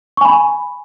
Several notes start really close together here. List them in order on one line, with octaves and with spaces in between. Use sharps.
C#6 G#5 B5